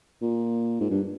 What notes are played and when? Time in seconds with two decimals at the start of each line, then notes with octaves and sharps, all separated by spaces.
0.22 A#2
0.81 G#2
0.91 G2